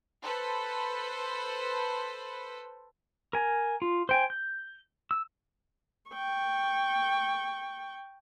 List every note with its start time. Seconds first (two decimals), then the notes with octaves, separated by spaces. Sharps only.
0.22 A4 B4 C5
3.33 A#4 G#5
3.82 F4
4.09 C5 G5 G#5
4.30 G6
5.11 E6
6.11 G5 C#6